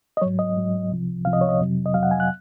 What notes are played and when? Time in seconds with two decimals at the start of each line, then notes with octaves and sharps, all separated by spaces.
0.17 D#5
0.21 G#2 F#3 C#5
0.39 D#5
0.56 G#2 F#3
0.91 C2 C3 F3
1.25 C2 C3 F3 F5
1.33 D#5
1.41 C#5
1.49 D#5
1.60 F2 C3 F#3
1.86 D#5
1.94 F2 C3 F#3 F5
2.03 F#5
2.11 G#5
2.20 F#6